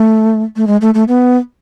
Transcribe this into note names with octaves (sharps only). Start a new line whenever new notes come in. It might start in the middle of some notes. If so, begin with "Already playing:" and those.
Already playing: A3
A3
G#3
A3
A3
B3